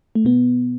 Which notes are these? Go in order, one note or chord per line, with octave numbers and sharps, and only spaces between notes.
A3
B2 B3